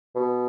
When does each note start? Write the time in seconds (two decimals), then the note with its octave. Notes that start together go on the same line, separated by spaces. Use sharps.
0.16 B2